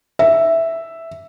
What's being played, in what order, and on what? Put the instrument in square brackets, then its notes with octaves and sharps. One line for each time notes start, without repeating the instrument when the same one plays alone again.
[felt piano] E5